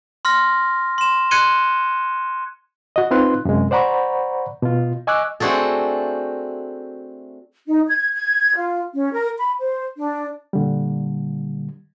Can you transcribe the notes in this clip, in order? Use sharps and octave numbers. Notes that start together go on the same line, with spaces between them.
C6 F6 A#6
C6 E7
C6 F#6 G#6 C#7 D#7 G7
F#4 D#5
C4 D#4 F4 B4 C6 F#6
F#2 C3 G#3
C5 D5 F#5 A#5 B5 C#6
B2 F4
D#5 G#5 C#6 D6 E6 F#6
A3 C4 D4 F#4 G#4 A4
D#4
G#6
G#6
F4
C#4
A#4
B5
C5
D4
A#2 D3 G3